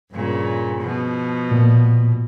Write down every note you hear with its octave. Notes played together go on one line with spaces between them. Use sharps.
G2 A#2 C#3
B2 F3
A#2